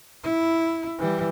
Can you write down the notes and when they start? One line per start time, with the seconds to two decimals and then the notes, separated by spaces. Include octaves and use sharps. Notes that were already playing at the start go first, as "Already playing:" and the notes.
0.24 E4
0.99 E3 G3